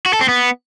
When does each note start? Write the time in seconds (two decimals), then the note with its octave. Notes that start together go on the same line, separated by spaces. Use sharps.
0.06 F#4
0.13 A4
0.21 C4
0.28 B3